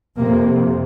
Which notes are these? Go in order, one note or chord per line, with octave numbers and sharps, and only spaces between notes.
F2 C3 A#3